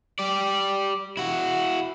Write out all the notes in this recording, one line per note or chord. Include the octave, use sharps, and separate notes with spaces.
G4 D5
E4 F#4